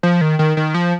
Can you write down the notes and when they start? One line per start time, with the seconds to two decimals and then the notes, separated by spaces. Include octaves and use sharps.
0.03 F3
0.21 D#3
0.39 D#3
0.57 D#3
0.74 F3